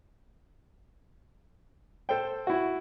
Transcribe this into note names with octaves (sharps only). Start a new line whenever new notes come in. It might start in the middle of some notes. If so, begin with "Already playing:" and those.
A4 C5 G5
E4 F#4